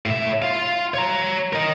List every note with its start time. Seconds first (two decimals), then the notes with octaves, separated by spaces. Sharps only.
0.06 A2 E5
0.42 F4 F5
0.94 C#5 A#5
1.53 A#4 D#5